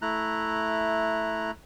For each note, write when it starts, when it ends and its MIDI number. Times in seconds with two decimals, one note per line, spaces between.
0.02 1.51 57
0.02 1.51 64
0.02 1.51 82
0.02 1.51 90